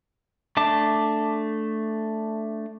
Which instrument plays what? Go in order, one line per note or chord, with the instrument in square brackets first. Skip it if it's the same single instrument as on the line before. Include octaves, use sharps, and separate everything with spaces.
[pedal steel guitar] A3 D4 A5 D6